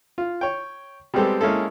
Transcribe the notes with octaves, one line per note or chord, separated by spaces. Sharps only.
F4
C#5 G5
G3 G#3 B3 C4 G4 A4
G#3 A#3 C#4 E4 A4